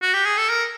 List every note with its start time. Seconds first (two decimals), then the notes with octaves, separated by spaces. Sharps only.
0.02 F#4
0.14 G4
0.25 G#4
0.38 A4
0.50 A#4